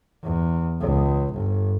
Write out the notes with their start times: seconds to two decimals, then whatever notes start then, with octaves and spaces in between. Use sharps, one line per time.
0.23 E2
0.81 C#2
1.34 G1